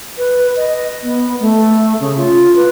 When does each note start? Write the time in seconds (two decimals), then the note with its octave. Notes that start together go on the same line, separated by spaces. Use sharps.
0.18 B4
0.57 D#5
1.03 B3
1.40 A3
2.00 C#3
2.17 F4
2.56 B4